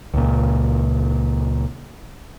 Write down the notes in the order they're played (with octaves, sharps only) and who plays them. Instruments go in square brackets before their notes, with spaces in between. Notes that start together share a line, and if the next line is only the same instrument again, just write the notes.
[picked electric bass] C#2 A#2